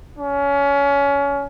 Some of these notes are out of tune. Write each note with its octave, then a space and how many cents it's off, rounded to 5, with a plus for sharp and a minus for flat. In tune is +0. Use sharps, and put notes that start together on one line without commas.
C#4 +25